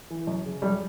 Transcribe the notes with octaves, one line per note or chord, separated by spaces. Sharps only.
E3
F#2
C#3
F#2 G3